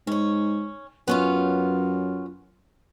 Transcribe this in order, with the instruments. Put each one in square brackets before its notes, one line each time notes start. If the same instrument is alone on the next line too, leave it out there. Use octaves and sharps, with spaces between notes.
[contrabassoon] G#2 [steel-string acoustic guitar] C#4 C#5
[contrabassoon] F#2 [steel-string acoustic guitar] B3 C#4 F4